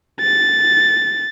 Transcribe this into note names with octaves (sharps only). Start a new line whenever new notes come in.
A6